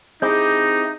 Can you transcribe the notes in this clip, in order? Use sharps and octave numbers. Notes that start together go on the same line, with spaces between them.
C4 D#4 E4 G4 G#4 G6